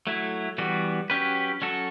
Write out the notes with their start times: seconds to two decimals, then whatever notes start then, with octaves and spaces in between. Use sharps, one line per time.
0.07 F#3 A3 E4
0.58 E3 G3 B3 F#4
1.10 F#3 C#4 G4 B4
1.62 F#3 C#4 F#4 A4